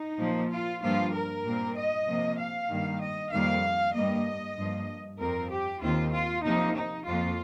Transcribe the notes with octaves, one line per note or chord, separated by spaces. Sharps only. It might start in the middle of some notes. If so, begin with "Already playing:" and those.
Already playing: D#4
A#2 F3 A#3
F4
G2 F3 A#3 F4
A#4
A#2 G3 C4
D#5
C3 F3 A#3
F5
G2 D#3 G3 A#3
D#5
F2 D#3 G3 A#3 F5
G2 G3 A#3 D#5
G2 F3 A#3
F2 F3 C4 A#4
G4
D#2 D#3 C4 F4
F4
C3 F3 A#3 D#4
D#4
F2 F3 A#3 F4